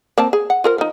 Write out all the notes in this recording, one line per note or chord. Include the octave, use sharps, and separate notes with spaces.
A#3 C4 A5
G#4
F#5
F4 A#4 C5
F3 D#4